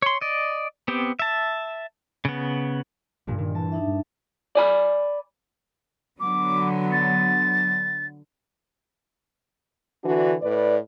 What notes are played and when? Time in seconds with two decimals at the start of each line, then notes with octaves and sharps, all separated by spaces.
0.02 C#5 C6
0.21 D5 D#5
0.88 B3 C4 G4
1.19 E5 A5
2.25 C#3 B3
3.27 A#1 G2 A#2
3.38 A#2 D#3
3.55 E3 A5
3.72 D4 D#4 E5
3.87 G2
4.55 D5 G#5 B5
6.20 D3 F#3 B3 D6
6.92 A6
10.05 D3 E3 D4 F#4
10.42 A2 B4 D5